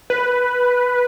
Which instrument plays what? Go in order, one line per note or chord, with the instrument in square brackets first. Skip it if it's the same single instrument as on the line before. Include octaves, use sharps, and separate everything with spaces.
[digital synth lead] B4